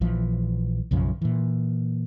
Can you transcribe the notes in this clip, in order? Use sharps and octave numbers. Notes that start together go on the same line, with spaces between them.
A#1 E3 F3
B1 F#2 C#3 F3
A#2 E3